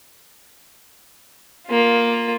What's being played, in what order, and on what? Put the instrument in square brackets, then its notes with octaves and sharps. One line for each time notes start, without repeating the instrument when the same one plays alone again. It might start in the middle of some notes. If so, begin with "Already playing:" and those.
[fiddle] A#3 F4